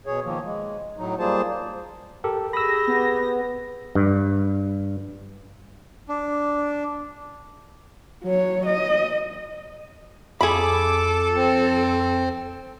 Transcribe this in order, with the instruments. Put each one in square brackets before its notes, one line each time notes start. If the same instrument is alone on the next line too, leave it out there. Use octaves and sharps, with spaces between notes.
[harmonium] B2 G#4 C#5
D#3 F3 A#3
G#3
A2 F#3 D#4
G3 A#3 F4 G#4 C5 A5
[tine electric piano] G4 A4 A#4
[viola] G4 G#4 [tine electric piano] B5 E6 [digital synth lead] D#6 [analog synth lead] A#6
[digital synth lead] B3
[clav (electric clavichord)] G2
[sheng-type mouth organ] D4
[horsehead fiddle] F#3 C#5
D#5
[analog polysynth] F2 [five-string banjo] G#4 B5 [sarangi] A4 [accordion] D6
[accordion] C4